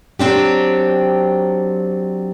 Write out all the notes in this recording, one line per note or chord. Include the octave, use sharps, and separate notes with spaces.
F#3 C4 D4 G4